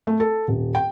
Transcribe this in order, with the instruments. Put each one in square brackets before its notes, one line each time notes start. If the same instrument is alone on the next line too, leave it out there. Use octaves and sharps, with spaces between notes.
[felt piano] A3
A4
D#1
G5